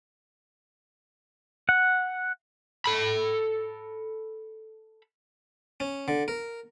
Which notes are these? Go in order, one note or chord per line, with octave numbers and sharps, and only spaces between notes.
F#5
A4 B5
C#4
D3
A#4